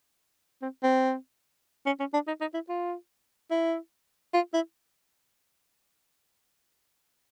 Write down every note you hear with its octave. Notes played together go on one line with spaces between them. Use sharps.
C4
C4
C#4
C#4
D4
D#4
D#4
E4
F4
E4
F4
E4